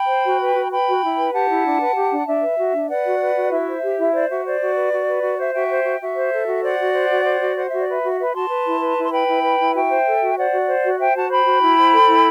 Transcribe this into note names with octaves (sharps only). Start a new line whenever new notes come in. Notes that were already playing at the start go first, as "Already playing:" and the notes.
Already playing: G5 B5
C5
F#4
B4
F#4
B4 G5 B5
F#4
E4
B4
G4 F#5 A5
E4
D4
B4
G4
D4
D4 E5
B4
F#4
D4
B4 D5 F#5
F#4
B4
F#4
E4 E5
C5
G4
E4
C5 D5
F#4 E5
C5 D5
F#4
B4
F#4
B4
F#4
C5 E5
F#4 E5 G5
C5
F#4
F#4 E5
C5
A4
F#4
C5 D5 F#5
F#4
C5
F#4
C5
F#4
C5 F#5
F#4 E5
D5
B4 E5
F#4
B4 E5
F#4 A5 C6
B4
E4
B4
E4
C6
B4 G5 B5
E4
B4
E4
F#4 E5 G5
C5
A4
F#4
C5 D5 F#5
F#4
C5
F#4
C5 E5 G5
F#4 F#5 A5
C5 G5 B5
F#4
E4
C5
A4
E4